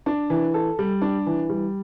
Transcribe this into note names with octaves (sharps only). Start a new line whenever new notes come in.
D4
E3
A4
G3
D4
E3
G3